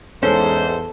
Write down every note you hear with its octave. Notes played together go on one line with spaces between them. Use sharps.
E2 G#2 G#3 C#4 A4 C5